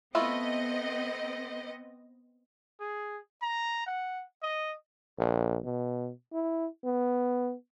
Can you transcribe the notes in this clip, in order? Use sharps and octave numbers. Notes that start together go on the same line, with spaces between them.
A3 B3 C4 E4 F4 D#5
G#4
A#5
F#5
D#5
A#1
B2
E4
B3